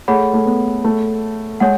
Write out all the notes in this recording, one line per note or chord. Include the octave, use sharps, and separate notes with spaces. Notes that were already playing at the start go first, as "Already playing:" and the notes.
A3 G#4 C#5 F#5 B5
A3
B3
A3
G#3 C#5 F#5